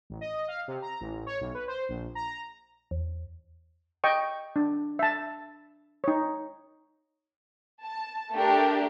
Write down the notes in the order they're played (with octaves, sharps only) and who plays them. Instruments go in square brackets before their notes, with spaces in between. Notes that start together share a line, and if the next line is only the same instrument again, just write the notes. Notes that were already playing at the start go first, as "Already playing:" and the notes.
[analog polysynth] A1
D#5
F5
C3
A#5
A1
C#5
B1
B4
C5
A#1
A#5
[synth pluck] E2
[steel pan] D#5 G5 C#6
D4
E5 A5
D#4 C#5
[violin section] A5
A3 D4 G4 A#4